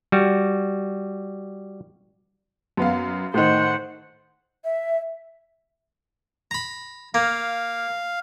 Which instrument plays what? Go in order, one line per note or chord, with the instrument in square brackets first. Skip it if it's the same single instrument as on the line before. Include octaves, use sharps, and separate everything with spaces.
[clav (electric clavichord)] G3 F#4
[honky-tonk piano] F#2 B3 F5
[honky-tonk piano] A2 D#3 [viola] C5 F#5
[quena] E5
[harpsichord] A#5 B5
[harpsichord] A#3 [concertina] F5